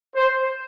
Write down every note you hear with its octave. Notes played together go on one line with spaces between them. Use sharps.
C5